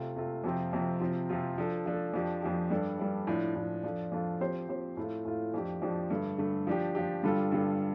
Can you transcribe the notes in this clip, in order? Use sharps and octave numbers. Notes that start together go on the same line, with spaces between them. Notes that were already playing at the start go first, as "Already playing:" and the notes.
Already playing: C3 A3 F4
C3 A3 F4
F2 C3 F3 C4 F4
F2 C3 F3 C4 F4
C3 F3 C4 F4
C3 F3 C4 F4
F3 D4 A4
F3 D4 A4
F2 F3 D4 G4
F2 F3 D4 G4
G2 G3 D4 A4 D5
G2 G3 D4 A4 D5
A2 F3 D4
A2 F3 D4
F2 F3 D4 F4 A4
F2 F3 D4 F4 A4
F3 C4 G4 C5
F3 C4 G4 C5
A2 A3 F4
A2 A3 F4
F2 F3 D4 G4
F2 F3 D4 G4
G2 D3 A3
G2 D3 A3
F3 D4 G4
F3 D4 G4
G2 D3 G3 F4 A4
G2 D3 G3 F4 A4